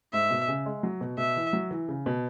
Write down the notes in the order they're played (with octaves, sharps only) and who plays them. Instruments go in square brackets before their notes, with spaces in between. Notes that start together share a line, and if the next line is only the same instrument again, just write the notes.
[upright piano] G#2 [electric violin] E5
[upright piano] B2
C#3
G#3
F#3
B2
[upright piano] B2 [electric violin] E5
[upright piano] E3
F#3
E3
C#3
B2